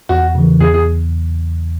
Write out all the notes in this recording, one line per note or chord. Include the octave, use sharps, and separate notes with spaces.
E2 F#4
C#3 E3
E2 G#4
G#4